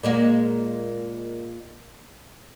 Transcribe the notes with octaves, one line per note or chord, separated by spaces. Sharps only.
A#2 G#3 A#3